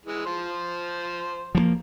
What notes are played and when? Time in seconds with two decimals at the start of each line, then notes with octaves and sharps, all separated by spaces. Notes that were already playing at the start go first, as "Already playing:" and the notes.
0.05 E3 G#3
0.26 F3 C5
1.55 F3 F#3 A#3